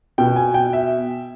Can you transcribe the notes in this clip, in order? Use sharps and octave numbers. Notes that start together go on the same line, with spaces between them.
B2 G5
G#5
G5
E5